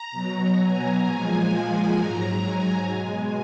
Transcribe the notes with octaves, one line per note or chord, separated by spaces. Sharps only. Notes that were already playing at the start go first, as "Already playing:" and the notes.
Already playing: A#5
B2 F#3
G#5
A#2 F3 G#3
G#5
G#2 F#3 A#5
G#5
B2 G#3